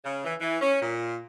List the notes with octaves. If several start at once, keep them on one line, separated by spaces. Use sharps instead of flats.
C#3
E3
E3
C#4
A#2